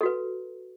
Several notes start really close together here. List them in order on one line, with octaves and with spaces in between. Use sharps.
A4 F#4 B4